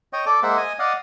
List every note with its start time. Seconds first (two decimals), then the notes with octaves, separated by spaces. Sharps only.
0.13 C#5 D#5 G5
0.26 A4 D5 D6
0.43 G#3 A#3 C5 E5 F#5
0.57 D#5 G#5
0.79 D5 D#5 F5 F#5